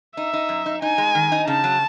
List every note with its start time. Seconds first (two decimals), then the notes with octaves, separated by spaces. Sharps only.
0.17 D#4 E5
0.33 D#4
0.49 F#2
0.66 D#4
0.82 D#4 G#5
0.98 G#3
1.15 D#3
1.32 D#4
1.48 C#3 A5
1.64 F#3